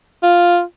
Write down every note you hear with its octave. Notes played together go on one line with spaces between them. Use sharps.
F4